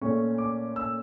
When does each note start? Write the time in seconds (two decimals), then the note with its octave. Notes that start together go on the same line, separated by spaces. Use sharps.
0.01 A#2 A3 C#4 C#6
0.38 D6
0.76 E6